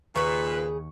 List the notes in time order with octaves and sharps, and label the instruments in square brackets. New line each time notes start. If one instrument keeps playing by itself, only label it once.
[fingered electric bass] D#2 [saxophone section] A#2 B4 [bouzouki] C#3 G#4 [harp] C#6